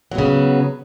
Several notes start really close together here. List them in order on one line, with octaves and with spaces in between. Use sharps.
F#3 B3 C#3